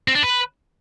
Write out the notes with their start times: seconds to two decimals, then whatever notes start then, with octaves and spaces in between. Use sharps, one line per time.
0.08 C4
0.15 D4
0.23 B4